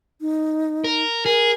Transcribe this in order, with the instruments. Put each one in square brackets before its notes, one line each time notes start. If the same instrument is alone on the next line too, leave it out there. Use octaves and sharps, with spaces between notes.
[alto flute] D#4
[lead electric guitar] A#4
[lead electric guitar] G#4 [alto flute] A#4